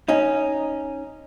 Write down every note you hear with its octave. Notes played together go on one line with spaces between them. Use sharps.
C#4 D#4